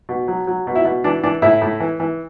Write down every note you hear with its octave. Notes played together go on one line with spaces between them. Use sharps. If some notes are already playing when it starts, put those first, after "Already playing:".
B2
F#3
F#3
B2
E4
B2
E3 D4
E3 D4
A2 E4
A2
E3
E3